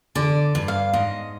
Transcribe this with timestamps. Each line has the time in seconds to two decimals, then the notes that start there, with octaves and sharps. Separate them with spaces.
0.15 D3 D5
0.55 G2
0.68 F5
0.93 G#2 D#5